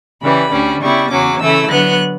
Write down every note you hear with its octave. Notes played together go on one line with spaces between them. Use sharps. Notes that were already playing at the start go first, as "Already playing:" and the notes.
C#3 E3 G3 B5
D2 D3 G3 C#4
C#3 G3 B3 E4 C#6
E2 C#3 F#3 C#4 D6
C#3 E3 A3 E4 E6
D3 F#3 B3 F#6